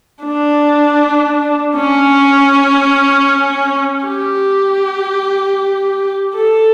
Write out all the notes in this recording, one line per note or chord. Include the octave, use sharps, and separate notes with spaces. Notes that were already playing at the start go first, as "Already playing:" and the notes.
D4
C#4
G4
A4